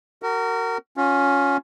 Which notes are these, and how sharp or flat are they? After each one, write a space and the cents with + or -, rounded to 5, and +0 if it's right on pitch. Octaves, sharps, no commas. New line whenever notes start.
F#4 +25 A#4 -25
C#4 +10 F4 +35